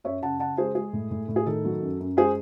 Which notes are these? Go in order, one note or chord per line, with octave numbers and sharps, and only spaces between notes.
F#2 C#5 E5
C#3 F#5 A5
C#3 F#5 A5
G#3 G#4 C5
G#3 G#4
A2
A2
A2
G#4
D#3 A4
F#3
F#2
F#2
G#3 G#4 C5